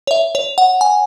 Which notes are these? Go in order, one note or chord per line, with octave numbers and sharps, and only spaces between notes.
C#5
E5
C#5
F#5
G#5